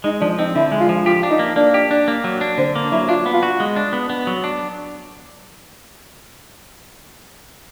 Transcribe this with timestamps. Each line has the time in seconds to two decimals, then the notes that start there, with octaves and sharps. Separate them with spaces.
0.04 G#3 D#4
0.21 F3 D4
0.39 C4 D#4
0.55 D3 E4
0.72 G#3
0.80 F4
0.89 F3
1.06 F4 G4
1.23 D4
1.31 D#4
1.39 A#3
1.56 A#3 D4
1.74 G4
1.91 D4
2.08 A#3
2.24 F#3
2.41 D4
2.58 D3 C4
2.75 A#3
2.92 F#3 E4
3.09 D4 F4
3.26 B3
3.34 F4
3.43 F#4
3.60 G#3
3.76 D4
3.93 B3
4.10 B3
4.27 F#3
4.44 D4